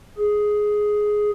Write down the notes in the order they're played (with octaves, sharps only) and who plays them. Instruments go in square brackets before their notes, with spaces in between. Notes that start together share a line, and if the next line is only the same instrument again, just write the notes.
[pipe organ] G#4